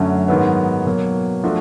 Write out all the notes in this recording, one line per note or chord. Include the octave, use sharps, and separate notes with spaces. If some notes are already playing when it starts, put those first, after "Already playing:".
Already playing: F#2 D3 F#3 A3 C#4
G#2 D#3 F#3 B3
B2 F#3 A#3
F3 A3 D4 F#4